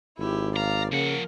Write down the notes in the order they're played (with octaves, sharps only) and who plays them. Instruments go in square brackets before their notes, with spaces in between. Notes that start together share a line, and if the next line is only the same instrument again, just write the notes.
[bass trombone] G#1 [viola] E4 G4
[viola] D5 F5 [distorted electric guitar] A#5
[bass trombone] C#3 [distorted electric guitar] F3 F#5 [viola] A#3 A#4